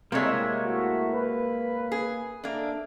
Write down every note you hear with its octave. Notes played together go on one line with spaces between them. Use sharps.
A2 C3 G3 G#3 A#3 C#5 E5
A3 E4 F#4
B4
G#4
A#3 D4 A4 E5